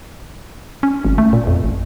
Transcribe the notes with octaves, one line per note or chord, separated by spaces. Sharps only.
C#4
G#1
A3
A#2
F2
A1